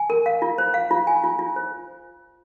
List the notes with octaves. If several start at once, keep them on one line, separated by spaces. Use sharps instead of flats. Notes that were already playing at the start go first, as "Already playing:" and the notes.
Already playing: G#5
A#4
F5
F4
C5
F5
F4
G#5
F4
F4
C5